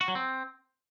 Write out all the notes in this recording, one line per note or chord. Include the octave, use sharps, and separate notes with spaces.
F#4
F#3
C4